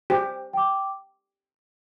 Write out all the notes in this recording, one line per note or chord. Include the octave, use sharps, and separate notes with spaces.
G4 C5
G5 D6